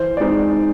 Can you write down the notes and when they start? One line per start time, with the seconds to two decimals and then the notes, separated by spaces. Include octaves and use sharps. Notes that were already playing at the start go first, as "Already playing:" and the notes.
Already playing: E3 C5
0.17 G#3 C4 D#4 D5